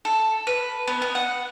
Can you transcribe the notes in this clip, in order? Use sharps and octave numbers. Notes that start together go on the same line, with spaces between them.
A4
B4
B3
B3
F#5